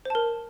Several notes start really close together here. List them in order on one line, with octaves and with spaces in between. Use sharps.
C5 A5 A#4